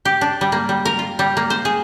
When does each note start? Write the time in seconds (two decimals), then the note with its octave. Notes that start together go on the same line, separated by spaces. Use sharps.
0.05 G4
0.21 D4
0.41 G3
0.52 A#3
0.69 G3
0.85 A#4
0.99 F4
1.19 G3
1.37 A#3
1.50 C5
1.65 G#4